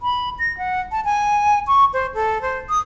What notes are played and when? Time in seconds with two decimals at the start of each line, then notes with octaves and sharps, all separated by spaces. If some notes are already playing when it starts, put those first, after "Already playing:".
0.02 B5
0.39 A#6
0.58 F#5
0.91 A5
1.05 G#5
1.67 C#6
1.94 C5
2.14 A4
2.42 C5
2.69 D#6